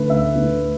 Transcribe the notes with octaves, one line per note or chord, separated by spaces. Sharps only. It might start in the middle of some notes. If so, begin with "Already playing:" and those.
Already playing: D3 A3 B4
D2 E5
D3 A3